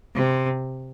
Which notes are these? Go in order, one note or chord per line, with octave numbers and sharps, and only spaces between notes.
C3